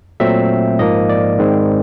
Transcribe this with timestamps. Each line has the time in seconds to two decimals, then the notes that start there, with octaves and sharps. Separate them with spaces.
0.20 A#2 F#3 A3 C4 E5
0.79 G#2 F3 A#3 D#5
1.09 D5
1.38 G#2 D#3 G#3 C4